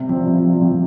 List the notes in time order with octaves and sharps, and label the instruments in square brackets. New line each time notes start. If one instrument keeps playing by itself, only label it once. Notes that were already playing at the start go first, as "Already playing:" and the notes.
Already playing: [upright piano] C3 G3
[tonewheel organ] F3 [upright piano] C4
[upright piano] C3
G3
C3